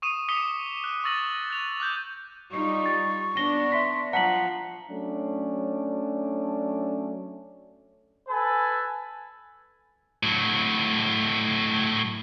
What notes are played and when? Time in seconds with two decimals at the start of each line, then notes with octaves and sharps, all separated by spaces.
0.02 C#6 D#6 D#7 E7
0.28 D6 D#6 B6 C#7 G7
0.84 F#6
1.04 C#6 E6 A6 A#6 F#7
1.50 F#6 F7
1.80 D6 F#6 G6
2.52 G3 D#4 F4 C#6
2.86 A6
3.37 B3 D4 A#6 G7
3.72 E5 C6 B6
4.13 F3 F#5 A5 A#5 B6 F#7
4.90 F#3 A3 C#4 D4
8.29 A4 B4 G#5
10.23 A2 F#3